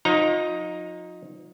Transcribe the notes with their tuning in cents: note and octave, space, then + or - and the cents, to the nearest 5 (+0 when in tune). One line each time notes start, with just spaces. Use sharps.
F3 +40 D#4 +0 A#5 +0